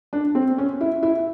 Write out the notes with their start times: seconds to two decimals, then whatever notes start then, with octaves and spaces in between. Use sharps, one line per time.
0.13 D4
0.35 C4
0.58 C#4
0.81 E4
1.03 E4